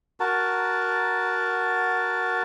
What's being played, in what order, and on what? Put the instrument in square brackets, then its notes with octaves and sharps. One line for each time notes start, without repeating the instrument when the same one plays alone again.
[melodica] F#4 A#4 A5